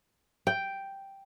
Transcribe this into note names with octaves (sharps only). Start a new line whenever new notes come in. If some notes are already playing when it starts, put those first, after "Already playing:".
G5